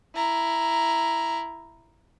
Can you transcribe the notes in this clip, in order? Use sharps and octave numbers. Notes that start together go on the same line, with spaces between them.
E4 A#5